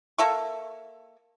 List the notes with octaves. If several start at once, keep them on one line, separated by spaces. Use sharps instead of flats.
A#3 A4 E5 C#6